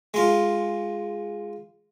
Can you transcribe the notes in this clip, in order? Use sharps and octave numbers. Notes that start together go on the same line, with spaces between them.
G#3 F4